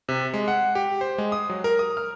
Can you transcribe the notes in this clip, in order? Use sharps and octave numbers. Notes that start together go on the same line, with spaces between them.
C3
G#3
F#5
G4
C5
G#3
D#6
F#3
A#4
D#6
F6